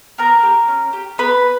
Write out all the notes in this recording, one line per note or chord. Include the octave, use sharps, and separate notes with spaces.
B3 A#4 A#5
G4
C#4
G4
B3 B4 B5